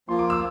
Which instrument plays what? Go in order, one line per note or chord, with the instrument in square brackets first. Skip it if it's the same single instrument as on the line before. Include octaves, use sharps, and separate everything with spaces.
[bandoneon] F3 A#3 F4 [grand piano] C6
[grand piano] D6
E6